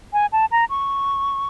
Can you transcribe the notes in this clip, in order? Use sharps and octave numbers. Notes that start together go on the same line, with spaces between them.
G#5
A5
A#5
C#6